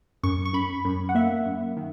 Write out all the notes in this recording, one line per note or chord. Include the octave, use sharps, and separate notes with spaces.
F#2 C#6
C#6
F#2 B5
F#2
F#5
A#3 E5
F#2
D#3